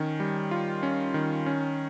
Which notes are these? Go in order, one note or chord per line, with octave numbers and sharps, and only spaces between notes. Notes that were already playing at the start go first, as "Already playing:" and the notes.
Already playing: D#3 C#4
G3
F4
C#4
D#3
C#4